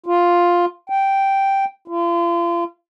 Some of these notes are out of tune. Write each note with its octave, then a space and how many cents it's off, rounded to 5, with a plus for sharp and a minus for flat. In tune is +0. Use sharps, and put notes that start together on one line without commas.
F4 +5
G5 -5
F4 -35